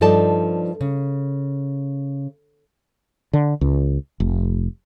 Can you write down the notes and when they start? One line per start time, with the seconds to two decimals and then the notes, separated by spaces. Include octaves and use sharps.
0.01 G2 F3 D#4 A4 D5 A5
0.81 C#3
3.33 D3
3.61 C#2
4.20 F1